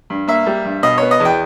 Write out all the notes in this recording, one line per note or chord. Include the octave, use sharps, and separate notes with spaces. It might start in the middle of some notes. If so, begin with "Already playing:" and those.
G2
A#3 E5
G3
G2
B2 D#5
B3 C#5
D#5
E2
G5